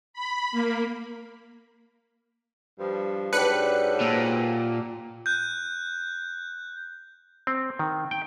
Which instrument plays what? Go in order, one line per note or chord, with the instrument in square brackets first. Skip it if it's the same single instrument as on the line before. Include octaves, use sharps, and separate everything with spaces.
[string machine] B5
A#3
[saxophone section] G2 F3
[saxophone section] G#2 F#3 [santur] D4 G4 [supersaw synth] B4 F#6 C#7
[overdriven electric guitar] A#2 [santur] E5 A5
[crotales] F#6 G6
[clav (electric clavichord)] C4
D#3
G5